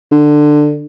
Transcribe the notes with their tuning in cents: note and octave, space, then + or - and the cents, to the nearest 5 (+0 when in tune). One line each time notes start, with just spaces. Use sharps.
D3 +15